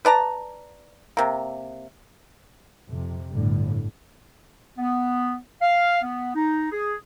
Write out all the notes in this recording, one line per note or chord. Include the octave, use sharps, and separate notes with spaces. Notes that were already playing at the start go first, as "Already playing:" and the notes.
B4 D5 A5 A#5
C3 A#3
F2 C3
G1 A2 D3
B3
F5
B3
D#4
G#4